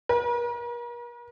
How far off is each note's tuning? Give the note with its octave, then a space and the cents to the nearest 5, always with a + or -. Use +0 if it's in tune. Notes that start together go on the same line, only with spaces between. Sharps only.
A#4 +45